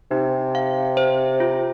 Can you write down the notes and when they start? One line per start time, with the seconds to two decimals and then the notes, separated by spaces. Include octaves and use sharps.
0.11 C3 D#4
0.55 F5
0.97 C5
1.40 F4